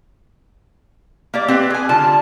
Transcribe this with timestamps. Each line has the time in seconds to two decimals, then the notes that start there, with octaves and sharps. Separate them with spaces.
1.34 A#3 G4 D5
1.48 C4 G4 B4 D5
1.70 G#4 G#5
1.89 D3 G3 F4 A5